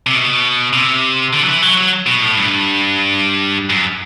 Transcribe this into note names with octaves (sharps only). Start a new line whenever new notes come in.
C3
B2
C3
D3
F#3
E3
F#3
F#3
B2
A2
G2
F#2